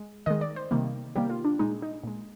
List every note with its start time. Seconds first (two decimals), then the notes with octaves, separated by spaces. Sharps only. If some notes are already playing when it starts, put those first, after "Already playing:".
Already playing: G#3
0.26 D#3 G#3 D#5
0.41 D5
0.56 C5
0.71 C3 D#3 G3 A#3
1.15 C3 D#3 G3 A#3 G4
1.30 F4
1.45 D4
1.59 A#2 G#3 D#4
1.82 D#4
2.04 A#2 G#3